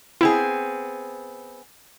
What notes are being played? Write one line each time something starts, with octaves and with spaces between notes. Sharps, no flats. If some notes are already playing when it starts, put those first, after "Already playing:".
B3 C4 E4 G#4